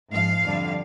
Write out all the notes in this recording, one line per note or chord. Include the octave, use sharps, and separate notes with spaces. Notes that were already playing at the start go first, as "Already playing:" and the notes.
G#2 F3 F5
F2 D3 G3